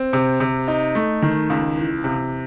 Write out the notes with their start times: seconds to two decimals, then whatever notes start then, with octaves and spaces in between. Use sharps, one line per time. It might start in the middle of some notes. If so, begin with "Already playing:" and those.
Already playing: C4
0.13 C3
0.40 C3
0.68 D#4
0.95 A3
1.22 D#3
1.50 C#2
1.77 E3
2.04 C3